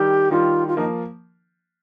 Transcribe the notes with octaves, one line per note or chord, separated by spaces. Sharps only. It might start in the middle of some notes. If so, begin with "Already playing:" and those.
Already playing: D#3 G3 G4
D#3 G3 F4
F4
F3 A#3 D#4